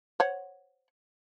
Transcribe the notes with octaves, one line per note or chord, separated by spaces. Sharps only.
C5 C#5 F#5